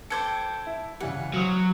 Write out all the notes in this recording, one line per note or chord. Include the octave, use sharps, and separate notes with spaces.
A4 C5 G5 D6 G#6 C#7
E4
C#2 E3 G3 F#5
F#3 C5 D#6 F6